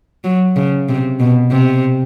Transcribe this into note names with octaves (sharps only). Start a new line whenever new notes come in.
F#3
C#3
C3
B2
C3